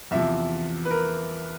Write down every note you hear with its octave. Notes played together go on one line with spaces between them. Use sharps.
E2 C3 F3 E5
B4
A#4